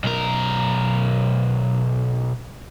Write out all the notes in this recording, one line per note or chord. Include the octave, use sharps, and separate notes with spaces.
B1 A#4